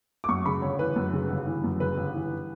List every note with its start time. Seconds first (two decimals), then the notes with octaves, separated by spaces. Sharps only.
0.24 D6
0.29 F#2 C#6
0.46 C#3 B5
0.62 G1 C#5
0.79 E3 B4
0.96 F#2
1.13 C#3
1.30 G1
1.46 E3
1.64 F#2
1.80 C#3 B4
1.97 G1
2.14 E3